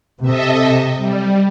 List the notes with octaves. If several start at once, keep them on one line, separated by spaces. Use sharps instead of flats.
C3 A4 D#5 E5
G3